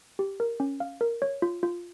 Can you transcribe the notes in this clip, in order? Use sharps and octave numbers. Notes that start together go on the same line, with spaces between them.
G4
A#4
C#4
F5
A#4
C#5
F4
F4